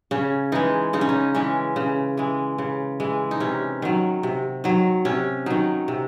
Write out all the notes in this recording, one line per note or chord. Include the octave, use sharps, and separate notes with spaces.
C#3 C#4
E3 G#3 D#4
C#3 D#4
C#4
D#4
E3 G#3 C#4
C#3
E3 G#3
C#3
E3 G#3
D#4
C3 C#4
D#3 F#3
C3
D#3 F#3
C3 C#4
D#3 F#3 D#4
C3